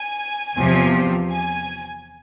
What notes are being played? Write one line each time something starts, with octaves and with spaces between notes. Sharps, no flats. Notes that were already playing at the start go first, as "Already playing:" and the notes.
Already playing: G#5
E2 C3 F3
G#5